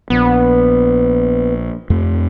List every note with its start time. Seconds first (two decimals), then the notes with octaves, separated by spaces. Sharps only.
0.10 A#1 B3
1.90 F2 A3